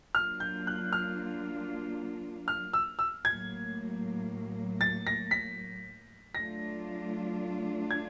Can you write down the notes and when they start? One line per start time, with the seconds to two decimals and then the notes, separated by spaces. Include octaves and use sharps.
0.15 F#3 A#3 D4 F4 F6
0.40 G6
0.67 F#6
0.93 F6
2.48 F6
2.73 E6
2.99 E6
3.25 A2 F#3 A#3 G#6
4.81 A6
5.07 A#6
5.31 B6
6.35 F#3 A3 D4 F4 A#6
7.91 G#6